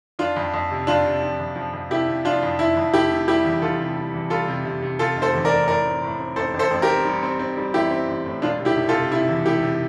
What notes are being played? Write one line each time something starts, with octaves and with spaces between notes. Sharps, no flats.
F2 D4 F4
F2
F2
C3
F2 D4 F4
C3
F3
F2
F3
F2
C3 E4 G4
C3
F3 D4 F4
F2
F2 E4
F2
F1 E4 G4
C3
G3 E4 G4
E2
E2 F4 A4
C3
G3
E2
G3 F4 A4
C3
C3
C3
C3 F4 A4
F1
A4 C5
E2
A#4 D5
F1
A2 A#4 D5
C4
A2
C4
A1 A4 C5
A1
A4 C5
A1
G4 A#4
C4
G3
C4
C4
G3
A1 E4 G4
C4
A1
A2
E1 D4 F4
C3
E4 G4
E1
F4 A4
C3
C3 E4
E2
E1 E4 G4
C3